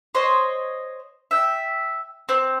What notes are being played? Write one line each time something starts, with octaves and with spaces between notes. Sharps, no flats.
C5 C#5 D#5
E5 G5
C4